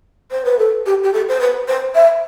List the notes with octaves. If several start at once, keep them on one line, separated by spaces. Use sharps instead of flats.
C5
B4
A4
G4
G4
A4
C5
B4
C5
E5